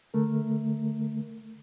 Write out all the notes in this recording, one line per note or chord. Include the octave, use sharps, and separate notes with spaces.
D3 A3 A#4